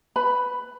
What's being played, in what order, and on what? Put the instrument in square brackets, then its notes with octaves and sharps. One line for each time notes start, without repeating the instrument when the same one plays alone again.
[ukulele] B4 B5